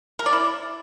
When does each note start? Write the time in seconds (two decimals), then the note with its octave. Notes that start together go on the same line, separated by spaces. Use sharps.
0.19 A#4
0.26 D5
0.33 E4